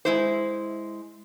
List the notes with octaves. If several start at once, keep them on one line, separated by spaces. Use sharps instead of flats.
G#3 E4 C5